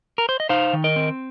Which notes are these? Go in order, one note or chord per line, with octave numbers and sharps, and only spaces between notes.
A#4
C5
D#5
D#4 C5 F5
D#3
A#4 D#5
C4